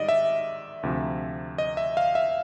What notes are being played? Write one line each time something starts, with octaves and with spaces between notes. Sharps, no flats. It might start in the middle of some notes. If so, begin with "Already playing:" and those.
Already playing: G#2 D#3 G3 D5 D#5
E5
D2 C3 F3
D#5
E5
F5
E5